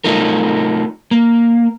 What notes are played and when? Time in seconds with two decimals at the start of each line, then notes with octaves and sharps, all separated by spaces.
0.04 A3 D#4 F4 A#4
1.11 A#3